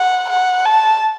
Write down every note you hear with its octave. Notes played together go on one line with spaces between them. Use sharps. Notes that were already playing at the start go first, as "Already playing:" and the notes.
Already playing: F#5
F#5
A5